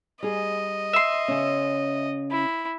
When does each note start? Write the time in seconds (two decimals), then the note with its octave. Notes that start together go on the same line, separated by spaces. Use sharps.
0.23 G3 G#4 D#5
0.93 E5 C6
1.28 C#3 C#4
2.31 E4